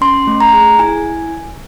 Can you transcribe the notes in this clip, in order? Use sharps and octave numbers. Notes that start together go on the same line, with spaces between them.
C#4 C6
A3
A#5
G#4
E4 G#5